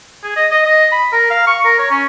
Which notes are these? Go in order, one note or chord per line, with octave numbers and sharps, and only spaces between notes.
G#4
D#5
D#5
D#5
B5
A#4
F5
C#6
A#4
C#5
C#4